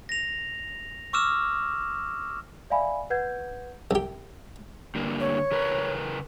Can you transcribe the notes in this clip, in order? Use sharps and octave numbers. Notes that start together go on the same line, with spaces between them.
A#6 F7
C#6 D6 E6 F6 E7
D5 E5 F5 G#5 B5
B4 F#5 G6 G#6
C2 G4
G2 D3 A#3
C#5
C#3 A#4 B4